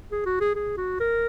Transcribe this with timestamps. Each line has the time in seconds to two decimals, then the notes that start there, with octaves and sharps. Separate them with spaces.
0.11 G#4
0.26 F#4
0.41 G#4
0.56 G#4
0.77 F#4
1.00 A#4